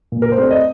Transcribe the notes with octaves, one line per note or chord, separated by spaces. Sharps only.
A#2
A#4
C5
A3 C4 D5
D#5